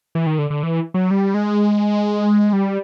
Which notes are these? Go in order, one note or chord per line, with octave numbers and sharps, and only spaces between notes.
E3
D#3
D3
D3
E3
F#3
G3
G#3
G3